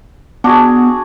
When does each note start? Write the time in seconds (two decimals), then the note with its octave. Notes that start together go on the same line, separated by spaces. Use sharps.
0.44 B3 D4 F#4 G#4